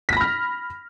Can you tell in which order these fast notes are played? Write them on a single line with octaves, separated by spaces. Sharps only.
B6 A#6 B5 F6